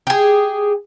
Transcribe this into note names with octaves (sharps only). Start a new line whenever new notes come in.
G4 G#4